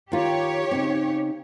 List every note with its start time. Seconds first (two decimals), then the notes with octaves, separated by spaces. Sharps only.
0.12 D#3 F4 G4 C#5
0.71 C#3 C4 D#4